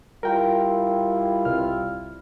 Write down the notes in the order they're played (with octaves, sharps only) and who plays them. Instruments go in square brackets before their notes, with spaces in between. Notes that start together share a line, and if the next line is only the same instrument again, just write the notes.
[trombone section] G3 E4 F4 [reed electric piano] A#4 G5 A#5
[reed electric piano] C2 F6